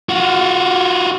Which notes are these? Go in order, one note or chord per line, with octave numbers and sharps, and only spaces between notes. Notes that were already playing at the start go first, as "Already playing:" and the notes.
F4 F#4